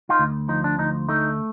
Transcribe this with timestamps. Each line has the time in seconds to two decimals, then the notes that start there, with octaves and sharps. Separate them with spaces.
0.09 D#4 F4
0.19 D2
0.49 F3 D#4
0.64 D4
0.79 D2 D#4
1.09 A3 D#4